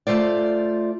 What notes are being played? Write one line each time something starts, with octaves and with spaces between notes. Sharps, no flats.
A3 F4 C5 D5